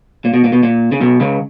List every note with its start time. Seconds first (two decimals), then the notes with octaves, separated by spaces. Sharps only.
0.25 A#2
0.34 B2
0.44 A#2
0.53 B2
0.63 A#2
0.92 C#3
1.01 B1 B2
1.20 C#2 C#3